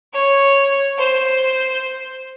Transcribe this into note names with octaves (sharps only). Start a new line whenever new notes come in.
C#5
C5